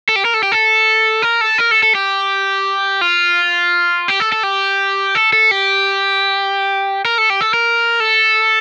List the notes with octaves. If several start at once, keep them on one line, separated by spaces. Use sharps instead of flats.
A4
G4
A#4
A4
G4
A4
A#4
A4
A#4
A4
A4
G4
F4
G4
A4
A4
G4
A4
A4
G4
A#4
A4
G4
A4
A#4
A4